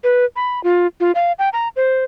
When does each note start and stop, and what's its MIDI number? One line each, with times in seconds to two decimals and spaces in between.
0.04 0.25 71
0.36 0.62 83
0.64 0.87 65
1.00 1.12 65
1.15 1.32 77
1.39 1.49 79
1.53 1.68 82
1.76 2.04 72